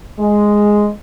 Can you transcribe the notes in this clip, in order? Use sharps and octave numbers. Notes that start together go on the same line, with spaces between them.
G#3